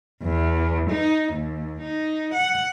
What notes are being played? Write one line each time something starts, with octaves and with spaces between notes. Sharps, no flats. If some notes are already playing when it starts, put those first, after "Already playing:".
E2
D#4
D#2
D#4
F#5